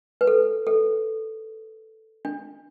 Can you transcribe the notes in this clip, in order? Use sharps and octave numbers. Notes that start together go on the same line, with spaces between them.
B4
A4
A4
D4